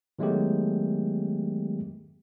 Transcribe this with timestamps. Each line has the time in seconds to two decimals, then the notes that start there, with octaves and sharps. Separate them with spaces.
0.19 D#3 F#3 G#3 A3 B3 G4